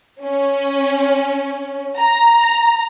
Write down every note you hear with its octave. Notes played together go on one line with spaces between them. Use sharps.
C#4
A#5